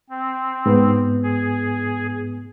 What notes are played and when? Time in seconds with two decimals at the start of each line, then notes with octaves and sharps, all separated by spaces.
0.10 C4
0.66 G#2 B3
1.23 G#4